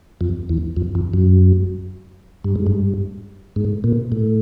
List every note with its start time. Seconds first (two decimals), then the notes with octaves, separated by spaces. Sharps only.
0.21 F2
0.49 E2
0.77 F2
0.95 F2
1.14 F#2
2.44 G2
2.56 G#2
2.67 G2
3.56 G#2
3.84 A#2
4.12 A2